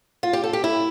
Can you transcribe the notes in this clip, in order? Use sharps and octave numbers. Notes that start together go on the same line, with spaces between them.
F4
G4
A4
G4
E4